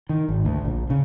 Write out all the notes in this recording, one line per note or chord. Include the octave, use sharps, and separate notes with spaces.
D#3
G#1
D2
A#1
C#3